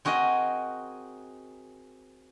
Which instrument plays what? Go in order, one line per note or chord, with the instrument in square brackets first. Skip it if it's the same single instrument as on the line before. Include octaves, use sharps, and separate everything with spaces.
[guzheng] C4 F#4 G#4 A#4 D#5